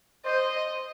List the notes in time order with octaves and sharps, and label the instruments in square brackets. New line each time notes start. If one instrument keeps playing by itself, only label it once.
[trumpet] C5 [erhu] D#5